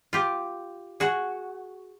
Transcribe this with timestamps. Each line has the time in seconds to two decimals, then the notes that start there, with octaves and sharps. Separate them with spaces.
0.13 F4 G4
1.00 F#4 G#4